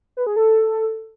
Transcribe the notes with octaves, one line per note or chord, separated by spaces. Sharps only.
B4
G#4
A4